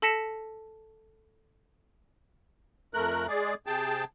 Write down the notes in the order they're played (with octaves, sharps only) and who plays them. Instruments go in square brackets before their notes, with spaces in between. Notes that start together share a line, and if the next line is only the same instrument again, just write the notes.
[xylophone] A4 A5 A#6 B6 C#7 E7
[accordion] F2 A3 A#4 F#6
G#3 G#4 D5
C3 G#4 G5 A5